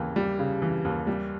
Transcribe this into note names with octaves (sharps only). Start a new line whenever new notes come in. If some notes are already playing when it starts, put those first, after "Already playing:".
Already playing: D#2 C#3 E3 G4
G3
C#3
E3
D#2
G3